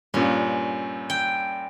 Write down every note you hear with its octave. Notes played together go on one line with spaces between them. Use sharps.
G2 A#2 C#4
G5